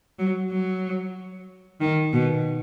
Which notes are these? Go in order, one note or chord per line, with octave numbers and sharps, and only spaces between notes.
F#3
F#3
D#3
B2